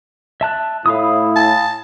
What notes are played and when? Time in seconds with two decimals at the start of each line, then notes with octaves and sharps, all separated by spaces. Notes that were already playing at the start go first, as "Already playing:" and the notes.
0.41 E5 A5 F#6
0.86 A2 E4 F5 B5 D#6
1.36 A5